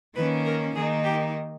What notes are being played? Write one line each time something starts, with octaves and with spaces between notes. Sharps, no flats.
D#3 A#3 C#4 B4
A#4
D#3 A#3 D#4 G#4
G4